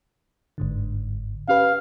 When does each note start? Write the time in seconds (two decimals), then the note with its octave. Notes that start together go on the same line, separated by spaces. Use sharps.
0.58 G1 G#2 D3
1.48 C#4 G4 B4 F5